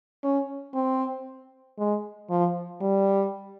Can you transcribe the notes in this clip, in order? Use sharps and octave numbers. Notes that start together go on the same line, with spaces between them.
C#4
C4
G#3
F3
G3